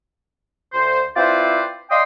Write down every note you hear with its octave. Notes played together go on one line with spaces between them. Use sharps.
D2 C5
C4 E4 F4 B4 C5 D5
D5 D#5 F5 G5 C6 D#6